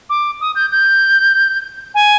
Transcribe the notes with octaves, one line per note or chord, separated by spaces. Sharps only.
D6
D#6
G6
G6
G#5